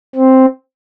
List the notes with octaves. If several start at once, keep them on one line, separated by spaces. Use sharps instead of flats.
C4